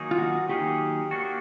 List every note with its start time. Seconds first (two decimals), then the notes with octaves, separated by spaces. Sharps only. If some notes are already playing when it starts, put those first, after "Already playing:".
Already playing: D#3 F#3 A#3 D#4 G#4
0.11 F4
0.18 F#4
0.49 D#3 F#3 A#3 D#4 G4 G#4
1.11 A#3 D4 F#4